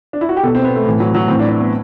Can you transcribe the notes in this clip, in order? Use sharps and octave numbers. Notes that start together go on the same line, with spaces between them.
D4
E4
F#4
G4
B2 A4
C4
B3
A3
A2 E3
F#3
F#3
A2 E3 C4
D4
D4
B3